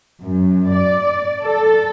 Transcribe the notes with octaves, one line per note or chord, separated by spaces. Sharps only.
F#2
D5
A4